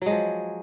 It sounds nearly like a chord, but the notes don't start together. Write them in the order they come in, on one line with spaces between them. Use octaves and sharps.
F#3 G#3 F3